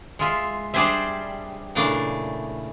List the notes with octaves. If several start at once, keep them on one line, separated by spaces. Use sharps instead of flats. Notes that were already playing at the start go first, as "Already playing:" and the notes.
G#3 F4 E5
G3 D4 G#4 C5 E5
A#2 C#3 E3 A3 D4